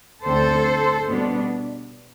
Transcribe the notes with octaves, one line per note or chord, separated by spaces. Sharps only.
D2 D3 A3 C4 A4 C5
B2 G3 B3 D4